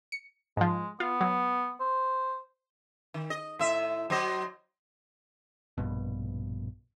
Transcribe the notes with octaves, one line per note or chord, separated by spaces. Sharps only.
C#7
G#2 F3 G#3
B3 F4
F#3
C5
D#3
D#5
A2 E5
F#3 C5 D#5
A#1 G2 B2